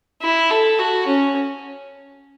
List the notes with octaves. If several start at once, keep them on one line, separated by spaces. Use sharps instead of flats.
E4
A4
F#4
C#4